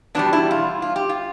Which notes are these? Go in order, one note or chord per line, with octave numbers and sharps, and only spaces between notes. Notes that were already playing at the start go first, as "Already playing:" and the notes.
E2 B2 G3 D4
E4
F4
F4
G4
F4